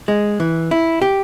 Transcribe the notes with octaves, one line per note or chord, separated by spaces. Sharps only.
G#3
E3
E4
G4